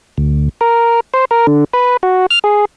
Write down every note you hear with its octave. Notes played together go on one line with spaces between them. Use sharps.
D2
A#4
C5
A#4
D3
B4
F#4
F6
G#4